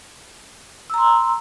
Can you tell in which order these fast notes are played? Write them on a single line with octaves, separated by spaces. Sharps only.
E6 A#5 C6